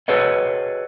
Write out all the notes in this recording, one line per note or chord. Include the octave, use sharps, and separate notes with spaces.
F#4 G#4 A4 B4 C#5 D#5